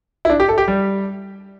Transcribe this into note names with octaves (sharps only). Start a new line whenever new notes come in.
E4
D4
G4
A4
G4
G3